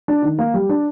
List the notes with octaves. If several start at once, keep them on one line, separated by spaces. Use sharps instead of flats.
D4
D#3
A#3
G3
D4